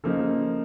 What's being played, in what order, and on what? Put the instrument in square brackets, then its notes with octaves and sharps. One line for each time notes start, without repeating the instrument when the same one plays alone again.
[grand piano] C#3 F3 A#3 D#4 A4